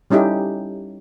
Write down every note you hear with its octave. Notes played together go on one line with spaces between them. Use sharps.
G3 C#4 D#4 E4 G4 A4